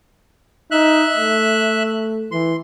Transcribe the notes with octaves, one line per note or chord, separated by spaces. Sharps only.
D#4 E5 F#6
A3
E3 C6